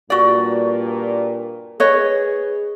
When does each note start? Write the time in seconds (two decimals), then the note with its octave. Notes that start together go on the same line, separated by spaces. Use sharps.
0.10 G2 A#2 F#4 D5
1.80 G#4 B4 C#5 D#5